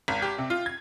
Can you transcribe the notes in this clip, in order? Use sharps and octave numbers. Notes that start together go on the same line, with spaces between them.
G#1
G4
C3
F4
G#6